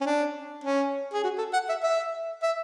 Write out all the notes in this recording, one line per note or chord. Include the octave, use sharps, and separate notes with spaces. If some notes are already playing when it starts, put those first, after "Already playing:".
C#4
D4
C#4
G#4
F#4
A4
F#5
E5
E5
E5